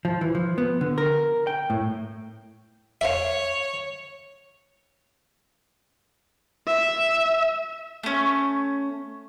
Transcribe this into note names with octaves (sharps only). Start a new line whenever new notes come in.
F3
E3
F3
B3
D3
A#4
G5
A2
C#5 E5 F5
E5
A3 C#4